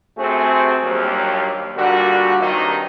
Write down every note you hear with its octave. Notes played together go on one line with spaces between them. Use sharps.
C3 A3 C4 F#4 G#4
A#1 D#2 F#3 G3 A#3 G4
A#2 D3 G3 A#3 F#4
G2 C3 D#3 F#3 D#4 G4